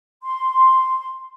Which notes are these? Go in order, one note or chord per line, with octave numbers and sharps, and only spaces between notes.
C6